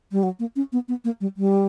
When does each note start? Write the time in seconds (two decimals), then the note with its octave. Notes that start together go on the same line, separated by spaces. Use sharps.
0.12 G3
0.23 F#3
0.39 A#3
0.56 C#4
0.72 B3
0.88 B3
1.05 A#3
1.21 G3
1.37 G3